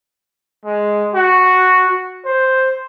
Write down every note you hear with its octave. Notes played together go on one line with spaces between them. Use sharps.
G#3
F#4
C5